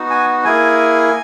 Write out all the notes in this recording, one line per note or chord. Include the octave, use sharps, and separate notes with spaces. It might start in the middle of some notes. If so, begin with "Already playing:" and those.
Already playing: B3 D#4 F#4
G#5
A#3 E4 G#4 G#5